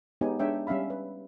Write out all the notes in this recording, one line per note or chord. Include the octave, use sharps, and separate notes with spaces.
G#3 B3 D#4 G4 C#5 G#5
G#3 D4 C#5 E5 G5
G3 C#4 E5 F5 B5
B4